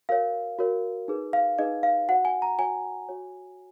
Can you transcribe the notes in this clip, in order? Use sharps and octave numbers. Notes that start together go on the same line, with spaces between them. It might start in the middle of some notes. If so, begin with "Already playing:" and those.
F#4 A#4 C#5 F5
F#4 A#4 C#5
D#4 G#4 B4
F5
D#4 G#4 B4 D#5
F5
F#4 C#5 F#5
G#5
A#5
F#4 C#5 G#5
F#4 C#5